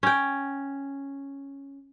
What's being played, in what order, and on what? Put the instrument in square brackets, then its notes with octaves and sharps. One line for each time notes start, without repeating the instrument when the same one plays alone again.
[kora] C#4 G5